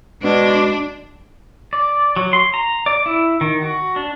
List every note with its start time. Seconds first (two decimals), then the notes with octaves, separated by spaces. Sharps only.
0.22 B2 G#3 D4
1.73 D5
2.16 F#3
2.33 C6
2.54 A#5
2.86 D5
3.06 E4
3.41 D#3
3.62 F#4
3.96 D4